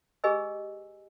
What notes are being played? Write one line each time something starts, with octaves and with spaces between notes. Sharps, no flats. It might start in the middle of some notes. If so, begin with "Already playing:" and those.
G4 G#4 B4 D#5 G#5 E6